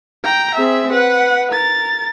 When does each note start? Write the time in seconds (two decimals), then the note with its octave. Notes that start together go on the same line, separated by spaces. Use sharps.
0.24 G5 A#5
0.55 C4 G#4 E5
0.92 B4 F#5
1.52 A#4 A6